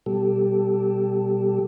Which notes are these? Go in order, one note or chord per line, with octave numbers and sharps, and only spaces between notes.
B2 G3 G4 A4